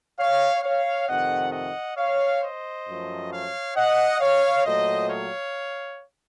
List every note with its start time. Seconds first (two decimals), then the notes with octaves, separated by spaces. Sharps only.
0.18 C#5 F5
0.63 C#5 F5
1.08 F2 C3 D#3 A3 D#5 F#5
1.52 D#5 F#5
1.97 C#5 F5
2.41 C5 D#5
2.87 F#2 F3 A3
3.31 C#5 F5
3.75 D#5 F#5
4.20 C#5 F5
4.65 A#2 F#3 A3 C5 D#5
5.10 C#5 F5